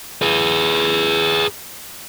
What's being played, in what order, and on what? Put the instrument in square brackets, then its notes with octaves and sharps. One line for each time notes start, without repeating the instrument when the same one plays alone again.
[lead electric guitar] G#4 B4